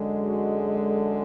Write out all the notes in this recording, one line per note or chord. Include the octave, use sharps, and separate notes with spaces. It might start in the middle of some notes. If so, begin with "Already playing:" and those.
Already playing: F#2 D3 G#3 G#4
F#4
G#4
A4